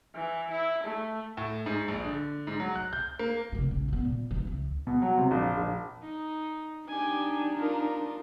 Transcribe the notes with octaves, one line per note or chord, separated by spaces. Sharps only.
E3
E4
A3
A2
G#2
A#1
D3
G#2
F#3
F#6
G6
A#3
F1 D3
A#1 C#3
D#3 B3
A#2
E3 D#4
C#2 E3
B2
F#3
C3
A#1
A#1
D#4
D4 D#4 G4 G#5
F4 A#4